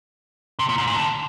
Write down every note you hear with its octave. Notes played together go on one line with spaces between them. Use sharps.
C3
A#2
G#2
A#2
D3